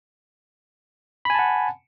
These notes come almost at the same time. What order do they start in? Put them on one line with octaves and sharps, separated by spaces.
B5 G#5 A5 F#5